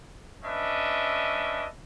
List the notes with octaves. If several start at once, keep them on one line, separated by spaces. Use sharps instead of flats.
C#4 D4 B4 D#5 E5